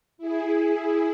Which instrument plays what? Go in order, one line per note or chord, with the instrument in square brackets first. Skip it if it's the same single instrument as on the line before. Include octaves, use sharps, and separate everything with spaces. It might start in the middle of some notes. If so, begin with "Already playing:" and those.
[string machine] E4 G#4